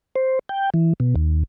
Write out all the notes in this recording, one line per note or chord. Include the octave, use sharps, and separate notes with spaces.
C5
G5
E3
B2
D#2